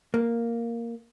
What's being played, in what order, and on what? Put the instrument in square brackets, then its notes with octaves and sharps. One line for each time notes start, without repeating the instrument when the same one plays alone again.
[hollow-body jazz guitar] A#3